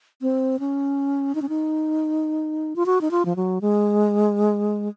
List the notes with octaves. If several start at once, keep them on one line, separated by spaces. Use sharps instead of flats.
C4
C#4
D#4
C#4
D#4
F4
F#4
D#4
F4
F3
F#3
G#3